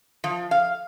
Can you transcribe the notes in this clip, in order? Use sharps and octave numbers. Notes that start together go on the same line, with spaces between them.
F3
F5